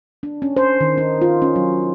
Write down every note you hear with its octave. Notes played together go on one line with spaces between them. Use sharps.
D4
C#4
C5
D#3
D#4
F4
C#4
F#3